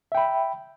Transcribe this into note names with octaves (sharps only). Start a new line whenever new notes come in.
E5 G5 B5